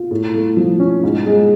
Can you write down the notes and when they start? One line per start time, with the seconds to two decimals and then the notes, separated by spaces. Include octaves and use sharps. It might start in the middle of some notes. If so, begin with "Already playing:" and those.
Already playing: F4
0.11 A2
0.34 A3
0.57 F3
0.79 C#4
1.04 G#2
1.26 G#3